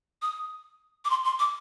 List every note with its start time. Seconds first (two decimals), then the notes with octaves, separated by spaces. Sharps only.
0.22 D#6
1.05 D6
1.10 C6
1.24 C6
1.39 D6